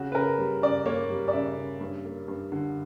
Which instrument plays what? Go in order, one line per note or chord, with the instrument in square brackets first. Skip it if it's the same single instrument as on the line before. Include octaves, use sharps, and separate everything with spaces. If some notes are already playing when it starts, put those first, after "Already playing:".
Already playing: [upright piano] C#3 F#4
B4
C#3 A#4
G3
C#3 D5
A#3 C#5
G3
D5
C#3 E5
C#3
G2
A#3
G2
D3